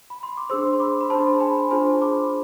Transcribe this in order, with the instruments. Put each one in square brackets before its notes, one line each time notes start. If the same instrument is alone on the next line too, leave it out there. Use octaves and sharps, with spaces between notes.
[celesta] B5
C6
D6
D4 G#4 C5 C6 E6
C6
B5 D6
B5
D4 G#4 C5 A5 C6
G#5 B5
D4 F4 G#4 C5 A5 C6
B5 D6